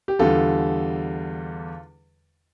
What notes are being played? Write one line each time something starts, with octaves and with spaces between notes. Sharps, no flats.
G4
E2 D3 G3 F4 A4